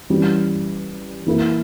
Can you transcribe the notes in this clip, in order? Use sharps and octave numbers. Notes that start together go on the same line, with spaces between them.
E3 G3 C#4
E3 A#3 E4 A#4